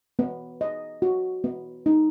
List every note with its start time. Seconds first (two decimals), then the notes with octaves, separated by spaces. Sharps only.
0.19 B3
0.61 D#5
1.02 F#4
1.44 B3
1.86 D#4